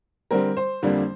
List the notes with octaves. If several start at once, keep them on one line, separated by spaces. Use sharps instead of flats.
D3 G3 C4 A#4
C5
F2 D3 G3 A#3 D4